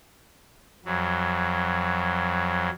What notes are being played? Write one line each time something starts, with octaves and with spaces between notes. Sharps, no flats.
F2 F#3